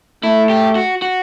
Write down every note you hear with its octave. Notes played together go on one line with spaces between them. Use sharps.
A3 E4
G4
F#4
F#4